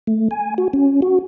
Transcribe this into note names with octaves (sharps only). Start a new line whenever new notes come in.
A3
G#5
F#4
C#4
F#4